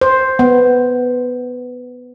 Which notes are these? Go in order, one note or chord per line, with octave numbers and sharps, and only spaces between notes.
C5
B3